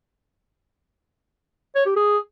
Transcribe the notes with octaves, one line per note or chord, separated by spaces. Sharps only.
C#5
G4
G#4